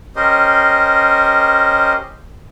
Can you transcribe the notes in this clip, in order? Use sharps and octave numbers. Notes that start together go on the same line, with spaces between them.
C#4 G4 A#4 C5 D#5